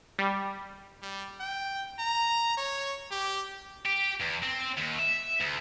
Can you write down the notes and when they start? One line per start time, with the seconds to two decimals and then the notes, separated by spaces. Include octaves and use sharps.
0.19 G3
1.02 G3
1.40 G5
1.99 A#5
2.57 C#5
3.11 G4
3.85 G4
4.20 E2
4.42 C4
4.77 D#2
4.99 E5
5.40 D2